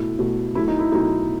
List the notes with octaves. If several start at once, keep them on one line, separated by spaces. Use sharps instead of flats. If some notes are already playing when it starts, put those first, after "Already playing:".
Already playing: B2 A3 E4
B2 A3
B2 F#3 A3 E4
D#4
E4
B2 F#3 A3 D#4